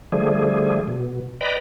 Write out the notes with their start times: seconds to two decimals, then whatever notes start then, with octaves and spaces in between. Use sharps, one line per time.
0.12 D3 F3 G3 A3 G#4
0.88 B2
1.41 B4 D5 D#5 G5 A#5 B5